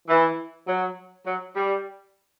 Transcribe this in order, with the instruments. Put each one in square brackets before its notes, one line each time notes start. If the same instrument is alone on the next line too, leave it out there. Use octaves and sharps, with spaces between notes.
[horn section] E3
F#3
F#3
G3